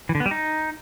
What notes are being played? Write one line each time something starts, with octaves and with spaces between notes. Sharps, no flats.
E3
D3
B3
G3
D#4